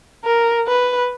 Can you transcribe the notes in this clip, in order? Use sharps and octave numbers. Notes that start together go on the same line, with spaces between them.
A#4
B4